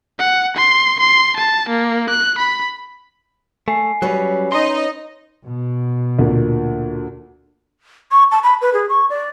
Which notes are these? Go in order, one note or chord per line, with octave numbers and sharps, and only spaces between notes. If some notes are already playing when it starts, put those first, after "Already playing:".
F#5
C6
C6
A5
A#3
F#6
B5
A3 G#5 C7
F#3 G3 C#4 B4 C#5
D#4 D#5 C6
B2
D2 A#2
C#6
A5
B5
B4
G#4
C#6
D5